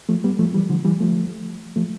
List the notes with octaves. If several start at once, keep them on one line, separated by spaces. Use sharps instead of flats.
F3 A3
G3 B3
F3 A3
E3 G3
D3 F3
E3 G3
F3 A3
F3 A3